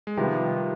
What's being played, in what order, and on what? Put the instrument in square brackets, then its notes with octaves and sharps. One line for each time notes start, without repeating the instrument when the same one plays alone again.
[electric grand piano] G#3
[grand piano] C3 F3 B3 [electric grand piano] D#3 G3